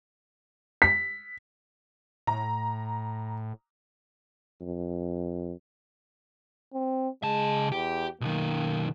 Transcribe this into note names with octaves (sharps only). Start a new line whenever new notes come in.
B6
A2 A#5
F2
C4
C#3 G#3 A5
E2 G4
B1 D#3 A#3